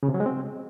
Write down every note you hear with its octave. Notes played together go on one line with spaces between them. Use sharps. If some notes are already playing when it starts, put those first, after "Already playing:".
C#3
C3
F#3
G#3
C4